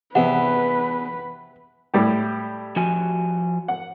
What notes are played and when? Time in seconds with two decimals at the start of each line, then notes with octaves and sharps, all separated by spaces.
0.15 E2 C3 B4 F#5
1.94 A2 G3 G4
2.76 F3 F#4 G#5
3.68 F#5